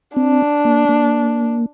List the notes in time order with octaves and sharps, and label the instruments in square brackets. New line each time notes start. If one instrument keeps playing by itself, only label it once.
[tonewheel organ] C4 [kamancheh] D4
[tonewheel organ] A#3
A#3